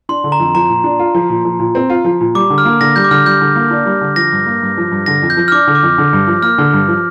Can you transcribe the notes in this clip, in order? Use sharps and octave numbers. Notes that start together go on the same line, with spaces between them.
D4 C6
D3
A#5
F2
F3 A#5
A#2
D4
F4
F3
A#2
F3
A#2
C4
F4
F3
A#2
G3 D6
D3
F6
A#3
D3 A#6
G3 G6
D6
D3 F6
G3 G6
D3
A#3
D4
G3
D3
F3 A#6
G2
A#3
G2
F3
G2
D3 A#6
F2
G6
F3
F6
D4 D6
D3
D6
F2
D3
G2
F3
A#3 F6
D3
G2
F3